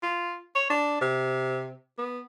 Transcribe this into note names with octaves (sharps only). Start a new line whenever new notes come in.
F4
C#5
D4
C3
B3